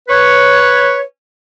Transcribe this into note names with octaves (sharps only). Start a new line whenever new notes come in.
B4 C#5